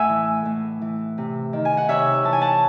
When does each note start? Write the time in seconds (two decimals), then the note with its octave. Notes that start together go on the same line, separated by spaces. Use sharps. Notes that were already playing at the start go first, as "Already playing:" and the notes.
Already playing: A2 E5 F#5 G#5
0.09 E3
0.45 A2
0.82 E3
1.18 C3
1.53 D#3
1.65 G#5
1.77 F#5
1.88 C3 C#5 E5
2.24 E3 A5
2.33 G#5
2.41 F#5 A5